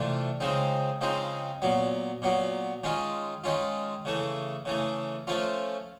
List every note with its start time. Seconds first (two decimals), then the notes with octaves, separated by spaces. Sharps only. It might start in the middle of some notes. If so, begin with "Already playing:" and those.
Already playing: C3 E3 A3 D4 F4
0.40 C#3 F3 G#3 C4 D#4
1.01 C#3 F3 G#3 C4 D#4
1.62 A#2 F#3 B3
2.22 A#2 F#3 B3
2.84 D#3 G#3 C#4 F4
3.44 D#3 G#3 C#4 F4
4.05 C#3 E3 A3
4.65 C#3 E3 A3
5.27 F3 A3 C#4 F4